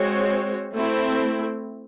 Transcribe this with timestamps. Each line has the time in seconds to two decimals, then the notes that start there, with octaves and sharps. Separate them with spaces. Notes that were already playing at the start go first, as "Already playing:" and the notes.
Already playing: G#3 C4 F#4 C#5
0.73 A3 C4 E4